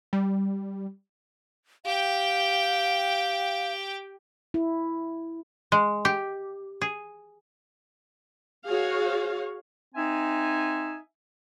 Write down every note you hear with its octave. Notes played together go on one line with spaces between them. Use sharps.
G3
G4 F5 G5
E4
G#3
G4
G#4
F#4 G#4 C#5 F5
C4 D#4 E5 G#5